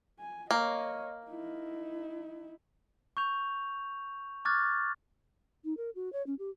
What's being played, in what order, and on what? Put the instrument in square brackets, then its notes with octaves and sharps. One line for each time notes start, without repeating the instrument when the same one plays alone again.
[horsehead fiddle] G#5
[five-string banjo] A#3 [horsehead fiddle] C#5 D#5
[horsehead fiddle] D#4 E4
[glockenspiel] C#6 G6 F7
C#6 D6 F6 F#6 G#6 A6
[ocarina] D#4
A#4
F#4
C#5
C#4
G4